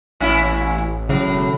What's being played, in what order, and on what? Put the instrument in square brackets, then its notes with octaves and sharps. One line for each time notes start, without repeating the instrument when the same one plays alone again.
[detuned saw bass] A1 [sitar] A#2 C#4 E4
[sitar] A2 F#3 [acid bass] C#3
[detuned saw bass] E1